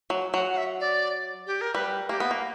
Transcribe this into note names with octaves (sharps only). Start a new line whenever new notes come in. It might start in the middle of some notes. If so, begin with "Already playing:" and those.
F#3
F#3 F#5
F#5
E5
D5
G4
A#4
G3 B4
A#3 G4
B3
A#3